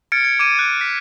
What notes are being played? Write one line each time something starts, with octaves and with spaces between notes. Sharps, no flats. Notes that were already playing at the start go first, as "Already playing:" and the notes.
F6 G#6 A6 C#7 D7
G#6
D6 G#6 D7 D#7
F#6
B6